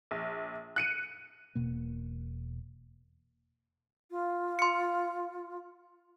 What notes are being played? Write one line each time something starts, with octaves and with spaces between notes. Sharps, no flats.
A#1
F#6 C#7 D#7
E1 B2 A#3
F4
C6 C#7